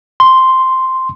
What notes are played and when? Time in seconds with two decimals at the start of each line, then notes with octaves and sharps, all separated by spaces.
0.20 C6